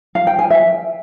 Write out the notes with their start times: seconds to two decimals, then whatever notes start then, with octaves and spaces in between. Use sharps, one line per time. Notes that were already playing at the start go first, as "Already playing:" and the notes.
0.15 F5
0.27 G5
0.39 G#5
0.50 E5